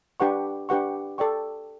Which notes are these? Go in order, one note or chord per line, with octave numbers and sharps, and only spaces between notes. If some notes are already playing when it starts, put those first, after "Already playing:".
D4 G4 B4 F#5 C#6
D4 G4 B4 F#5 C#6
A4 D5 G5 C#6